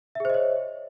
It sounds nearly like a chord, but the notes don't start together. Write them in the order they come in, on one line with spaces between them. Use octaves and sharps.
E5 G#4 C5 D#5 C#5